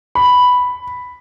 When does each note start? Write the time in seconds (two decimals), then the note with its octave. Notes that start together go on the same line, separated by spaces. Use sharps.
0.15 B5